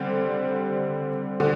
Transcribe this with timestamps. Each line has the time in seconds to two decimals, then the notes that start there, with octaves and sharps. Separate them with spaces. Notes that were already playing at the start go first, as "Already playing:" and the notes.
Already playing: D3 G3 C4
1.40 D3